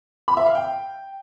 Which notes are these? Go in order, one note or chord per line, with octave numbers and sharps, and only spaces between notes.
B5
E5
F5
G5